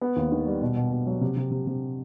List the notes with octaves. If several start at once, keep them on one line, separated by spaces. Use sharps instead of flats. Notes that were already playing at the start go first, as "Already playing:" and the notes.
B3
D#2
D#3
G3
B2
B2
B2
F#3
C3
C3
C3
C3